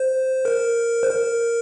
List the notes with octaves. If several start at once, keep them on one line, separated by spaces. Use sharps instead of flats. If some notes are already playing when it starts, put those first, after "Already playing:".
Already playing: C5
A#4
C5
A#4